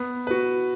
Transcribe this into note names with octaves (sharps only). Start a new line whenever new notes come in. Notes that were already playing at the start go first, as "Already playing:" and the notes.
Already playing: B3
F#4 B4